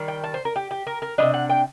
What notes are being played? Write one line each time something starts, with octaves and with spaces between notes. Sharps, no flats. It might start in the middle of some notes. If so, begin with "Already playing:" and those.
Already playing: D#3 G3
G5
A5
C5
A#4
G4
G4
A#4
A#4
C3 G3 D4 D#5
F#5
G5